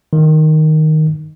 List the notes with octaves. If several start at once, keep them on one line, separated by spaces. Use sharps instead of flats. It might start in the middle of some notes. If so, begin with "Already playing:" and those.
D#3